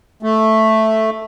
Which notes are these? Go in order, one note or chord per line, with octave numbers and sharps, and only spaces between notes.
A3